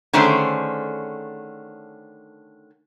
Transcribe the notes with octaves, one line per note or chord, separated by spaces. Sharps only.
D3 D#3 A3 C#4 G#4 C5